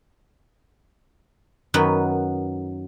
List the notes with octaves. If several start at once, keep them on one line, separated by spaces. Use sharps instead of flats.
F#2 D#3 B3 B4